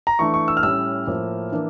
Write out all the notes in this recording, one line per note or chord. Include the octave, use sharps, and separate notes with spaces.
A#5
E3 A3 D4 C#6
C#6
E6
F6
A2 G3 C#4 E6
A2 F3 A#3
E3 A#3 D4